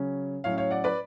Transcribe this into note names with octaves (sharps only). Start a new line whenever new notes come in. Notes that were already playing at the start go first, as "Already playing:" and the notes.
Already playing: C#3 F#3 C#4
A2 F#3 C#4 C#5 F5
C#5 F5
D5 F#5
B4 D5